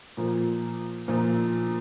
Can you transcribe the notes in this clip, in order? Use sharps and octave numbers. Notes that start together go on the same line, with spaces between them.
A#2 F3 A#3
A#2 F3 A#3